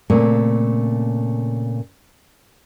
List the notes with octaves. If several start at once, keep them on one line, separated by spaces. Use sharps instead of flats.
A#2 C#3 A3 C4